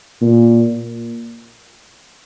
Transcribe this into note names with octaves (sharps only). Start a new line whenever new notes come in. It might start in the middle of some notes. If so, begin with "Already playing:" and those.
A#2